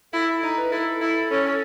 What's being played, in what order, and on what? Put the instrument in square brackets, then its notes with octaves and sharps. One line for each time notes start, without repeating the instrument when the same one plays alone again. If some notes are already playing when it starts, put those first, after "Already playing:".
[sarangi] E4 [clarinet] A4
[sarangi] D#4
[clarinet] B4
[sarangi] E4 [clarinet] A4
[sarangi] E4
[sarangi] C#4 [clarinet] A4